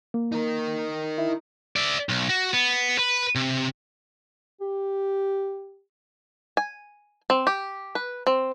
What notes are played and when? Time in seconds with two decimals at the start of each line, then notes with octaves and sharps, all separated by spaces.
0.14 A#3
0.32 D#4 A#4
1.18 E4
1.76 D5 E5
2.09 B1
2.29 F#4
2.53 B3
2.99 B4
3.35 C3
4.61 G4
6.57 G#5
7.30 C4
7.47 G4
7.95 B4
8.27 C4